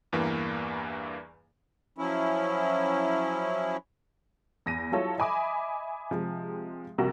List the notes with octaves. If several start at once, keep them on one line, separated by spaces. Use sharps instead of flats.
E2 G2 E3 A#3
F3 F#3 C#4 E4
E2 A#6 D#7
F#3 G3 E4 F4 A4 C#5
D#5 E5 G#5 B5 D6 D#6
C3 F3 G#3
A#1 C3 G3 F#4 A#4 A#5